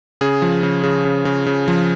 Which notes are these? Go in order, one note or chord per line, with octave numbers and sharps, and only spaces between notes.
C#3 G#4
F3
C#3
C#3
C#3
C#3
C#3
F3